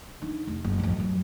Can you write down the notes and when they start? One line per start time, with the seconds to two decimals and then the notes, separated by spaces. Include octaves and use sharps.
0.22 D4 D#4
0.47 F1
0.64 F#1
0.79 A1 F2
1.00 F#2